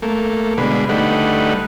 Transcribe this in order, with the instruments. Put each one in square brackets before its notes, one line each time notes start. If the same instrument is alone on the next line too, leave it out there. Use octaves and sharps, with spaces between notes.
[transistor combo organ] A3 A#3
B2 D3 G#3 B4
D3 G3 A3 D#4 B4 F#5